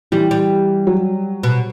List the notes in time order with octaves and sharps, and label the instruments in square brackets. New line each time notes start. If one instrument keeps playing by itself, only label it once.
[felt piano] E3 [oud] G3
[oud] G3
[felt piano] F#3
[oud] B2